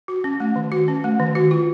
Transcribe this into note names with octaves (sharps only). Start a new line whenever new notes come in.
F#4
C#4
A3
D#3
F#4
C#4
A3
D#3
F#4
F4